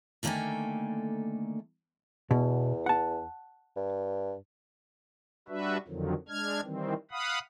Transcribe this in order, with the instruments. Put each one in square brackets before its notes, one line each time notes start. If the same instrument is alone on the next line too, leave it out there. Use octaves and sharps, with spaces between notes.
[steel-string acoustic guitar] D3 D#3 A3 A#3 G5 G#5
[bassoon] E2 [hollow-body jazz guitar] B2
[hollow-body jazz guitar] F#5 A5
[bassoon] G2
[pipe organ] G3 D4 F#4 B4 E5
F2 D3 D#3 F3 F#3
G#3 D4 F6 G#6
D#3 E3 G3 C4
F5 F#5 B5 D#6